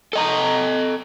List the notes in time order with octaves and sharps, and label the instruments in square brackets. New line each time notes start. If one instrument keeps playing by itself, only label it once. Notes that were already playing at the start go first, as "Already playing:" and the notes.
[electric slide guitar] A4 D#5 A#5